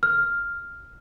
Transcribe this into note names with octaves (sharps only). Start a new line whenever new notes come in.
F6